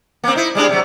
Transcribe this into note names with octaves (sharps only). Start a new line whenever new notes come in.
A#3 C4
D#4 E4
G3 G#3 D4
C3 F#3